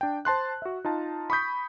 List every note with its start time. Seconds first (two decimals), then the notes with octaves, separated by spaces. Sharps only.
0.01 D4 G5
0.25 C5 A5 C6 F#6
0.62 F#4 E5
0.85 D#4 F4 A5
1.30 B5 C#6 D#6 G6 B6